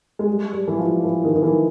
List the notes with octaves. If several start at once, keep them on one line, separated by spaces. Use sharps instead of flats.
G#3
G3
G3
E3
F3
E3
D#3
D#3
E3